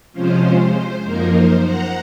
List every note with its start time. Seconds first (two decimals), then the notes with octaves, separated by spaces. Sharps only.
0.13 C3 F3 G#3 C#4 F4 C5
1.04 F#2 F3 A#3 D#4 A#4
1.34 C5
1.64 F#5 A#5